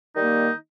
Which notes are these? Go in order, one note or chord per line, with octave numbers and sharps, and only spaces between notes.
D#3 G3 A#3 D#4